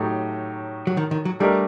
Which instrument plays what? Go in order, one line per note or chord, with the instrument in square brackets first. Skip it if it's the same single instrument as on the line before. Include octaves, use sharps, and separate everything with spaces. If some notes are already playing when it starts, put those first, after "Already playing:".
Already playing: [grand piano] A2 F#3 A3 D#4 G4
[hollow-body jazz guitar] F#3
D#3
D#3
F#3
[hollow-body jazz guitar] G3 [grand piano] A3 D4 G4 A#4 D#5